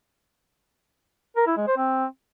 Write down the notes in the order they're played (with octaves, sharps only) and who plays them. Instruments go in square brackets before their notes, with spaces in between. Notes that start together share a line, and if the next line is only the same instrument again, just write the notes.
[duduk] A#4
E4
G#3
C5
C4